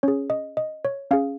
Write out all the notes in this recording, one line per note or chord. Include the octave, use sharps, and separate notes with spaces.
C#4 G#4 C#5
D#5
D#5
C#5
C#4 G#4 F5